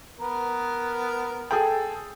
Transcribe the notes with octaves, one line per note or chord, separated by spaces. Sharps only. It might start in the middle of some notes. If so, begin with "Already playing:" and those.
B3 A#4
G#4 A4 G5